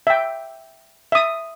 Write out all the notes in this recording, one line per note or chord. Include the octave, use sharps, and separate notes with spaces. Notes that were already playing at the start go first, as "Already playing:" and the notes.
E5 G5
E5 D#6